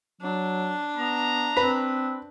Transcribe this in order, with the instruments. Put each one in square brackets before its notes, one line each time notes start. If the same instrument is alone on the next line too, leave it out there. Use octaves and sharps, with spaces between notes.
[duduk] F#3 [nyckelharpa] D4
[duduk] B3 [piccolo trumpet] A#5
[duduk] C4 [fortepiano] B4